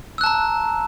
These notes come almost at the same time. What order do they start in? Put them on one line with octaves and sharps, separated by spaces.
E6 F#6 A5 A#5